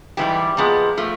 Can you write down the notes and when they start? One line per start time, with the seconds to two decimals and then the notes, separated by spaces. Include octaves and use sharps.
0.17 G#2 E3 G3 G4
0.57 A#2 F3 G#3 B3
0.97 F3 A3